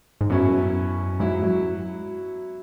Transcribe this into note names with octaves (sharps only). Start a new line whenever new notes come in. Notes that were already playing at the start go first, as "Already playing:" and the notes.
G#2
F#2 B2 F#3 C#4 E4
G#2 F#3 E4
F#2